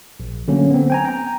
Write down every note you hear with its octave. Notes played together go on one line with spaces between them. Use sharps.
A#1
D3 F#3 A3 A#3 C#4
B3 C4
G5 G#5 A#5
G5 A#5